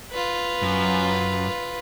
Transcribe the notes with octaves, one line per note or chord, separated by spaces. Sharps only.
F4 B4
F#2